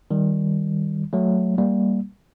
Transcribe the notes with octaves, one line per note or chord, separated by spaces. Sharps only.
D#3 G3
F#3 A3
G3 A#3